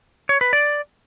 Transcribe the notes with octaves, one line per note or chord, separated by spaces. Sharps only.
C#5
B4
D5